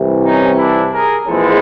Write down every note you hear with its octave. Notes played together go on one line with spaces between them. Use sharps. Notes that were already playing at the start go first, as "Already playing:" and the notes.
Already playing: C2 C3 E3
C#4 D#4
D4 E4
G#4 A#4
A#1 G#2 E3 G#3 C4 A4 B4